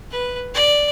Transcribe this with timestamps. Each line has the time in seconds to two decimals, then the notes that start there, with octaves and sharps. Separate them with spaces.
0.11 B4
0.54 D5